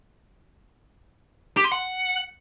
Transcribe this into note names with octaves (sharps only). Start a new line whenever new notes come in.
G4
C6
F#5